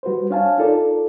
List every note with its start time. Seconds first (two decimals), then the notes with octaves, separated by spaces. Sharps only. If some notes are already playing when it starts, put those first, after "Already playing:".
0.03 G3 F#4 B4 C5
0.31 D4 C#5 F5 G#5 A5
0.58 D#4 F4 A4 A#4 D5